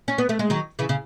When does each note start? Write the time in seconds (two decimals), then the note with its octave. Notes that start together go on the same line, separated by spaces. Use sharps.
0.08 C#4
0.18 B3
0.29 A3
0.39 G#3
0.50 D#3 F#3
0.79 C#3 E3
0.89 C#3